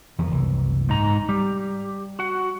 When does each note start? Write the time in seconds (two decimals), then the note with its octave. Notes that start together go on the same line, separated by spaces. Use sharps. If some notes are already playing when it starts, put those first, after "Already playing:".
0.19 E2 D#3 F3
0.31 F#1 C2 E3
0.89 G#2 D#4 A#5
1.29 G3 G4
2.19 F#4 F#5